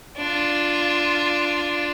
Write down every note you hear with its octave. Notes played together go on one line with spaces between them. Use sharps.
D4 F4